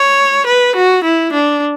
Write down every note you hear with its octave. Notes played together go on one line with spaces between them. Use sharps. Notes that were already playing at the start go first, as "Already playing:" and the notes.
Already playing: C#5
B4
F#4
E4
D4